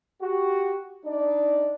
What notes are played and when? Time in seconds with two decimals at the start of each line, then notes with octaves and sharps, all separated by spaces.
0.22 F#4 G4
1.05 D4 D#4 D5